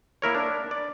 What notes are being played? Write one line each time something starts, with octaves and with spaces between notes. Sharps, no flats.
A#3 E4 A#4 C#5
D4
D5